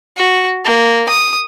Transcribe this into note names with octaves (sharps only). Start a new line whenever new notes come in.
F#4
A#3
D#6